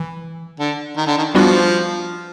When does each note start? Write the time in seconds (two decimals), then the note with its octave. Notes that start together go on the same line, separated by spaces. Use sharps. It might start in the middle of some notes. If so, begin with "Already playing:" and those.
Already playing: E3
0.60 D3
0.97 D#3
1.07 D3
1.18 D#3
1.34 F3 G3 B3 D4 F#4